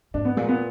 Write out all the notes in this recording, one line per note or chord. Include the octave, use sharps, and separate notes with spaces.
G#2 D4
B3
A#2 G#3
B3